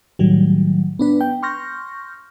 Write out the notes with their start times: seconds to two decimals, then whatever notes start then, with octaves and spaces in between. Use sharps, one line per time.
0.19 A2 D#3 F#3 G3
0.99 B3 D4 B4
1.21 G5
1.43 C6 C#6 F6 G6 A#6